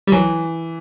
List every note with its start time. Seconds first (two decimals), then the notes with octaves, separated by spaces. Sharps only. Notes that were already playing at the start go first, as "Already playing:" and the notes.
0.07 G3
0.12 E3 F#3